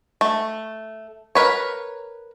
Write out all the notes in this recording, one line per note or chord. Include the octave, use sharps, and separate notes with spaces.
A3
A#4 B4 C#5